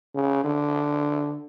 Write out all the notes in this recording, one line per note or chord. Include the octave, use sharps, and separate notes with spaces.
C#3
D3